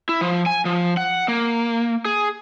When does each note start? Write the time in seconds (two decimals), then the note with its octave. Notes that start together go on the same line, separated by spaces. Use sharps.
0.09 E4
0.21 F3
0.46 G#5
0.65 F3
0.97 F#5
1.28 A#3
2.05 G#4